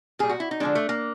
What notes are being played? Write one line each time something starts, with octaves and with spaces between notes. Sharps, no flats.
A#2 G3 G#4
F#4
E4
D#4
D3 F3 G#3 D4
A3
A#3